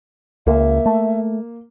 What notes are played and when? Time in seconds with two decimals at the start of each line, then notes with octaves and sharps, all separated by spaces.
0.47 C#2 A#3 E5
0.86 A3